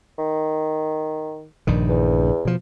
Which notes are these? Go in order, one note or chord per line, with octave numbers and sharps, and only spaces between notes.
D#3
A#1 G2 D#3
E2
B2 F3